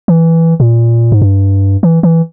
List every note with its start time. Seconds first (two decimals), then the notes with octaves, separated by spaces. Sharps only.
0.08 E3
0.60 A#2
1.12 G#2
1.22 G2
1.83 E3
2.03 E3